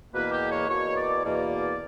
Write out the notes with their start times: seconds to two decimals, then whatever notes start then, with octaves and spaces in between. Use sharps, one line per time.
0.13 E2 B2 A#3 B4
0.31 G4
0.50 C#5
0.68 E2 B2 A#3 C#5
0.96 D5
1.23 E2 B2 A#3 D5